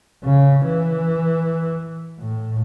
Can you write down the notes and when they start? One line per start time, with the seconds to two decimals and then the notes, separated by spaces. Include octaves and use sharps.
0.24 C#3
0.65 E3
2.19 A2